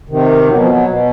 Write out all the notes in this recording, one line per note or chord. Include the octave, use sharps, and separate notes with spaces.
C3 D#3
B2 F#3
F3
F#3
B2